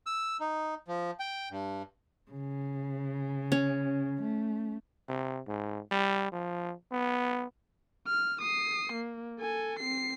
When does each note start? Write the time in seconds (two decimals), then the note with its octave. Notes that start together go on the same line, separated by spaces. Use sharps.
0.06 E6
0.40 D#4
0.88 F3
1.20 G5
1.51 G2
2.31 C#3
3.52 C#4
4.21 A3
5.09 C3
5.48 G#2
5.91 G3
6.32 F3
6.92 B3
8.07 F6
8.41 D#6 C7
8.93 A#3
9.39 A4 G#5
9.79 C4 C7